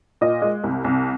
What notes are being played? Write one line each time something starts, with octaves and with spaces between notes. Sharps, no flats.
A#2 D#5
G#3
C2
C2